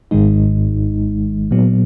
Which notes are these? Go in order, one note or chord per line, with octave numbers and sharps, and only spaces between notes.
G#1 G#2 D#3 G#3 D#4
A#2 F#3 B3